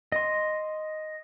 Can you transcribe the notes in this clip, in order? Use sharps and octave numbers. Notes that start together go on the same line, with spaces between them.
D#5 C6